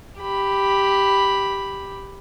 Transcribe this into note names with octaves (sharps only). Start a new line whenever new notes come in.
G4 B5